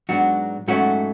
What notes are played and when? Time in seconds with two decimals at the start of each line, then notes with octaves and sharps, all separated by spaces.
0.09 G#2 F#3 B3 D4 F#4
0.68 G#2 F#3 A3 C#4 F#4